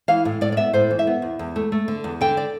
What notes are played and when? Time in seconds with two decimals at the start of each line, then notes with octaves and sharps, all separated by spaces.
0.08 E3 F5
0.25 A2
0.41 A2 D5
0.52 D5
0.57 B3 E5
0.73 A2 C5
0.91 E3
0.99 E5
1.07 B3
1.22 E2
1.39 E2
1.56 A3
1.72 A3
1.88 D3
2.04 E2
2.21 D3 G5
2.37 D5